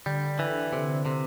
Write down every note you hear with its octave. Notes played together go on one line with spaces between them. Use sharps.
D3 G3
E3
C3
C3